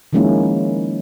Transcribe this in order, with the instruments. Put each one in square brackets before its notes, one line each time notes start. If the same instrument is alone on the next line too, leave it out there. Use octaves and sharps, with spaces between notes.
[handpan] D#3 F3 G#3 A#3 C#4 E4